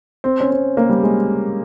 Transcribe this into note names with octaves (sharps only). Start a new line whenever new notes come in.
C4
C#4
C4
A#3
G3
G#3